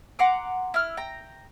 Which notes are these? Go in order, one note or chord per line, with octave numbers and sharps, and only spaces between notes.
F#5 A#5 C6 D6
E4 F6
G5 A#5